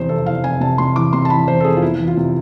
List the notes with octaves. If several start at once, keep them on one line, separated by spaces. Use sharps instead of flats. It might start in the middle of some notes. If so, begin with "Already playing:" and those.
Already playing: E2 C3 C5
F1 A4
E2 F5
F1 G#5
C3 A5
C3 C6
E3 D6
C3 C6
A5
E3 B5
E2 C5
A4
F1 G#4
F4
B3 E4
E3
F4
C3